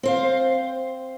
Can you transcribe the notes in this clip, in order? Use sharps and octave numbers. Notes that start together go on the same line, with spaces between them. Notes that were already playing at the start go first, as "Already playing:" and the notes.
C4 C5 F5